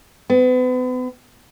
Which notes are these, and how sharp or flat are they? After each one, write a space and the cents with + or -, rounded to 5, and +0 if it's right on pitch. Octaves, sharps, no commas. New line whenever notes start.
B3 +40